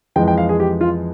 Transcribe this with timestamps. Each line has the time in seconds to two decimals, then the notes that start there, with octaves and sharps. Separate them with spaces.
0.16 F2 E3 G#3 G5
0.28 G5
0.38 F5
0.49 G#4
0.60 G4
0.81 F4